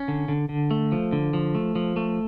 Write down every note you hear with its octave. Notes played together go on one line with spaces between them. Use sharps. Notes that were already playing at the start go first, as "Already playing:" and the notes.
Already playing: C#4
D3
D3
D3
A3
F3
D3
F3
A3
F3
A3